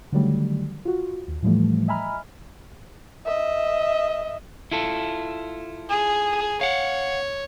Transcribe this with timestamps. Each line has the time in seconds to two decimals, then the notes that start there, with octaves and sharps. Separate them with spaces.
0.12 D3 D#3 F#3 G3 A3
0.85 F4 F#4
1.28 D#2
1.42 A2 E3 F3 G3 A3
1.88 D#5 E5 G#5 A#5 B5 F6
3.26 D#5 E5
4.71 E4 F4 A4
5.90 G#4
6.61 C#5 F5 F#5